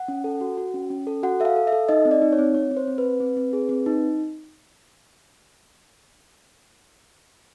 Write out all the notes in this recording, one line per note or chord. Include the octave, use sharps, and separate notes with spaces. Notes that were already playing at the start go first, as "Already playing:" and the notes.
Already playing: F#5
C#4
A4
F#4
F#4
C#4
C#4
A4
F#4 F#5
A4 E5
F5
A4
E5
A4
D#4 D#5
C4
D5
D#4
C#5
C4
C4 C#5
C4
C5
C4
B4
C4
C4
C4
G#4
C4
D#4